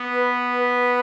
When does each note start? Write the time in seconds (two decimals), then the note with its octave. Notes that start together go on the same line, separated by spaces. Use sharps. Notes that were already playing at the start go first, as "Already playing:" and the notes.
Already playing: B3
0.13 B4
0.53 B4